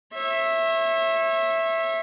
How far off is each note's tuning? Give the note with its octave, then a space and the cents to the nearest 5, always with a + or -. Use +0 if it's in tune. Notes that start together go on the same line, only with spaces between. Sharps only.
C#5 -35 E5 +0